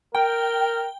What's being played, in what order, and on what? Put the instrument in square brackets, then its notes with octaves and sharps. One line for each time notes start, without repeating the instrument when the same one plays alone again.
[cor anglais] A#4 [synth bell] G5